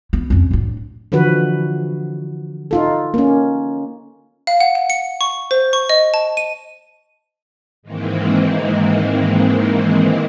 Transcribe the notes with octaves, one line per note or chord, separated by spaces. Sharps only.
B3
F2 C#4
A2 D4
D3 E3 F3 F#4 B4
D#4 F4 A4
A#3 C#4
F5
F#5
F#5
C#7
C#6
C5
C#6
D#5
A5
D#7
G#2 D#3 E3 G#3 A#3 C4